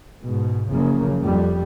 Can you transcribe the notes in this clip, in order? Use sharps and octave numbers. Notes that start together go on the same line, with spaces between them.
G#2 B2
F#1 C#3 F3 A#3
F2 G3